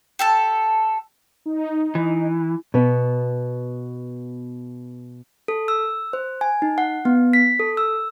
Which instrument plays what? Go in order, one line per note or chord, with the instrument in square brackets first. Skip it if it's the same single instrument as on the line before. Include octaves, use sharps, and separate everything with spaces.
[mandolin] G4 A4 A5
[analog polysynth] D#4
[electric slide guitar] E3
[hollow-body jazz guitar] B2 B3
[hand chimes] A4
E6
C5
G#5
D#4
F#5
B3
B6
A4
E6